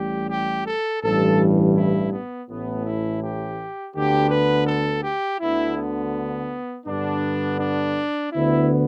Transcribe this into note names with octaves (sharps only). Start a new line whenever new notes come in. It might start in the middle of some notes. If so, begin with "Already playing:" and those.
Already playing: A1 A2 G3 G4
G4
A4
A1 G2 E3 G3 A4
E4
B3
A1 A2 E3 B3
E4
G4
D2 D3 B3 G4
B4
A4
G4
D2 D3 B3 E4
B3
G2 D3 B3 D4
D4
D2 D3 B3 E4